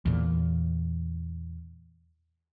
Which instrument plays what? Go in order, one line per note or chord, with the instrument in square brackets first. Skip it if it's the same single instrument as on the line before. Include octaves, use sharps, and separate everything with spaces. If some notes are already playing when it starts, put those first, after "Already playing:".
[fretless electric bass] E2 A#2